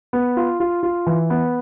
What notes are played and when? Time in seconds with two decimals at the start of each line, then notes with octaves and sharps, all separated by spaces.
0.13 B3
0.37 F4
0.60 F4
0.83 F4
1.06 E3
1.30 B3